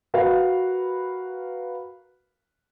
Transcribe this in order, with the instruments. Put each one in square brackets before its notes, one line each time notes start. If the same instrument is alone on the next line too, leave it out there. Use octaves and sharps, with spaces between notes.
[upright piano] F#4 A#4 B4 F5